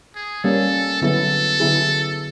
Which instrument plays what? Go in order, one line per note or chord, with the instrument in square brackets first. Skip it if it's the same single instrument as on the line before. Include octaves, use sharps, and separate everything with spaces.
[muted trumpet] G#4
[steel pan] G3 A#3 C#4 [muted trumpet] A4
[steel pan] D3 F#3 B3 E4 G#4 [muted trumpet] A4
[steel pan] D3 F#3 B3 E4 G#4